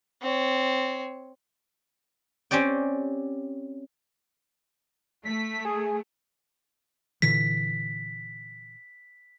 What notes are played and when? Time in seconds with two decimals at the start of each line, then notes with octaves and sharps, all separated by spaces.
0.22 C4 C#5
2.51 C4 C#4 G4 D5 G5
5.25 A3 B6
5.65 G#4
7.22 A#2 D3 E3 B6